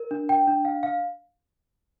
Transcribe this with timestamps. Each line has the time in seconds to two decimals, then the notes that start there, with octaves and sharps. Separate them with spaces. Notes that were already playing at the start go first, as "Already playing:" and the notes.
Already playing: A#4
0.11 D4
0.29 G5
0.48 D4
0.65 F5
0.83 F5